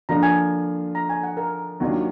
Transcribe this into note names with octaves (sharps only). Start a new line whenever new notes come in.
D3 F3 A#3 D4 F4 A#5
G#5
A#5
G#5
F#5
A#4
D#2 D#3 F#3 D4 F4